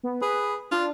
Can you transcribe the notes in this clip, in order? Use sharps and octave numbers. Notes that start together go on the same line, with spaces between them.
B3
G#4 B4
D4 F4